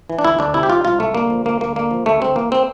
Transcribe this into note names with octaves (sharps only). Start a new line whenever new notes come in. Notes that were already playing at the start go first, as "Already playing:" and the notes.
E3
D4
D2 E4
D2 D4
C3 E4
G4
F3 F4
C2 F4
C2 A3
D3 A#3
F3
D2 A#3
D2 A#3
D3 A#3
F3
D2 A3
D2 C4
E3 A#3
C4